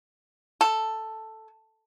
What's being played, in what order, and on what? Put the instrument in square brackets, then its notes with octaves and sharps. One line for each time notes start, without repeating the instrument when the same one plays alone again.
[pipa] A4